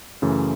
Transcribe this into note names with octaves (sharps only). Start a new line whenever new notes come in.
F#2 C#3 E3 A3